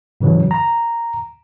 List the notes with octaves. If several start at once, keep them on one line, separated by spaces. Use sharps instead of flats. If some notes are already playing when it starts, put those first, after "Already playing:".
G#2 C#3 E3 F#3
A#5